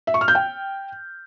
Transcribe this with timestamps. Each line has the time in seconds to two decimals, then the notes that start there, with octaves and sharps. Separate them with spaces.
0.07 E5
0.14 C#6
0.21 F6
0.28 G6
0.35 G5